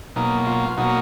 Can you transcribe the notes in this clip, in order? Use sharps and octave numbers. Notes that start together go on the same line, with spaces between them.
B2 F#3 A#3 D#4
F4
B2 F#3 A#3 D#4 F#4